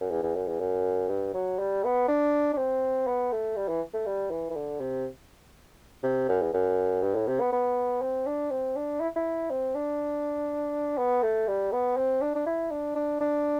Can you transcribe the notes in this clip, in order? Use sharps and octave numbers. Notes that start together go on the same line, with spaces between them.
F#2
E2
E2
F#2
E2
F#2
G2
F#3
G3
B3
D4
D4
C4
B3
A3
G3
E3
A3
G3
E3
E3
D3
C3
C3
F#2
E2
F#2
G2
A2
C3
B3
B3
C4
D4
C4
D4
E4
E4
C4
D4
B3
A3
G3
B3
C4
D4
D4
E4
D4
D4
D4